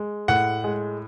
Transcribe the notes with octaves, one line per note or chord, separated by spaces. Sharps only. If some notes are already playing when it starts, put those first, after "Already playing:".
Already playing: G#3
A2 F#5
G#3